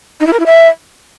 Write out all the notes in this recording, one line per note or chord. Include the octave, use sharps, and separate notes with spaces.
D#4
E4
A#4
E4
E5